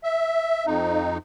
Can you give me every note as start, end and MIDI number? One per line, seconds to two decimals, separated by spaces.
0.04 0.66 76
0.66 1.18 41
0.66 1.18 63